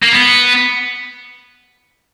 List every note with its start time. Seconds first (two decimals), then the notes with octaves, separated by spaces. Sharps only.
0.03 A#3
0.13 B3